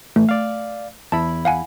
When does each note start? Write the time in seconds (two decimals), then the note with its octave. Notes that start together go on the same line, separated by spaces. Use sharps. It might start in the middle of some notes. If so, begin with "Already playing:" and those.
0.16 A2 E3 A3
0.29 D5 F5
1.12 E2 E4 A5 B5
1.45 F5 F#5 G#5